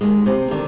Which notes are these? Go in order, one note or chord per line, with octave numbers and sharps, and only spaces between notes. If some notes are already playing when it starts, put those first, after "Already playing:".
D#2 D#3 G#3
C3 C4
D3 D#3 D4